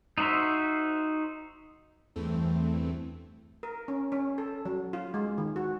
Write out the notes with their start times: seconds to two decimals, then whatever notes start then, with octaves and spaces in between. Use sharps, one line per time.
0.18 D#4 F#4 C5 E5
2.16 E2 G2 E3 A3 C4
3.63 A#4
3.88 C#4
4.12 C#4
4.38 A4
4.65 F#3
4.93 F4
5.14 G#3
5.38 D#3
5.56 F#4